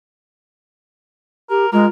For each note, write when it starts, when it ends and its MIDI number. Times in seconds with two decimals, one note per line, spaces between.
1.50 1.66 67
1.50 1.72 70
1.72 1.85 56
1.72 1.89 65
1.72 1.87 70